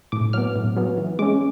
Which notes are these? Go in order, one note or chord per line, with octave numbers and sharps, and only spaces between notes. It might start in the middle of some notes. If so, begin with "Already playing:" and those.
A2 D6
F#3 B3 F6
A2
F#3 B3
E3
G#3 C#4 D6